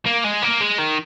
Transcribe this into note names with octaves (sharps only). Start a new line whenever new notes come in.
A#3
G#3
A#3
G#3
D#3